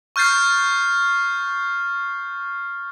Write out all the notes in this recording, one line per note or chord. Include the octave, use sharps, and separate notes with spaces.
C#6 F6 G6 A6 C7